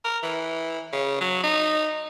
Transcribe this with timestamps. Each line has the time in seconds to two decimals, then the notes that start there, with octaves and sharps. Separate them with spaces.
0.04 A#4
0.23 E3
0.93 C#3
1.21 F#3
1.43 D#4